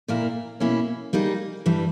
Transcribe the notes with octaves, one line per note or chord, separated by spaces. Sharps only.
A#2 A#3 E4 A#4
B2 A#3 C#4 E4
G3 A#3 D#4 G#4
G2 E3 G3